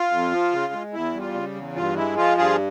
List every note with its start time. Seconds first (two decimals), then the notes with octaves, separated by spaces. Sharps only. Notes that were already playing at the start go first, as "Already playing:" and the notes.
Already playing: F4
0.11 F2
0.32 F3
0.52 C#3
0.73 G#3
0.93 E2 E4
1.14 G3
1.20 F4
1.34 C#3
1.55 E2
1.76 G2 F4
1.96 G#3 E4
2.17 F3 F4
2.37 G2 F4 G#4